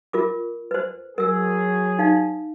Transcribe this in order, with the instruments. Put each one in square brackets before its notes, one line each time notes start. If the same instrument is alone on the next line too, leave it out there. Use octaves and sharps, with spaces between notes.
[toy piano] F4 A#4 D6
B4 C5
[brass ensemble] F#3 G#4 [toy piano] A#4 E6
[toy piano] D#4 F5